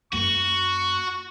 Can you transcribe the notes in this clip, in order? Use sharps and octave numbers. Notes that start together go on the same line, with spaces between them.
F#2 A#3 F#4 C#6